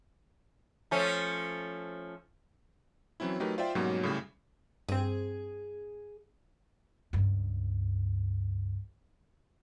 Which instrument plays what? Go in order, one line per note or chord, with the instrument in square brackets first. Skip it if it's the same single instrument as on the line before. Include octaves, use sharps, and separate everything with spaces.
[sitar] F3 A3 C#4
[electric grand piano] E3 F#3 C4 C#4 E4
F#3 A3 D#4 G4 A#4 B4
F4 C5 D5 E5 G5
G#2 B2 F#3 G3 A#3 C#4
A2 C#3 G3
[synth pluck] G2 C4 [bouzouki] G#4
[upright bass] C#2 G2